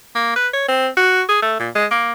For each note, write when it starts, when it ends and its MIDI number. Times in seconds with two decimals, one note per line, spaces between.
0.15 0.34 58
0.36 0.48 71
0.54 0.65 73
0.68 0.88 60
0.97 1.22 66
1.29 1.42 68
1.42 1.56 57
1.60 1.69 46
1.75 1.86 56
1.91 2.13 58